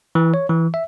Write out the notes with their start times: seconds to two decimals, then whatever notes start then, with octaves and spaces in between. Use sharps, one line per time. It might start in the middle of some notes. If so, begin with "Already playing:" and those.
0.15 E3
0.34 C#5
0.49 E3
0.74 E5